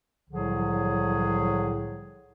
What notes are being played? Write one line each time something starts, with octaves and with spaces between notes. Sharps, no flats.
C2 A2 D3 F3 F#3 G#4